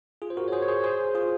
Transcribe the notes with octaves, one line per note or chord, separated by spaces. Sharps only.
F4 G#4
C5
F#4 A#4
C#5
G#4 C5
C#5
G#4 C5
G#4 C5
F4 G#4